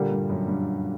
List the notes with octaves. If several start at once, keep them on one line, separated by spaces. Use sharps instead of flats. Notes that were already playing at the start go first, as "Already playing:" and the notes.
Already playing: A#2 D3 G3 A#3
G2
F#2
G2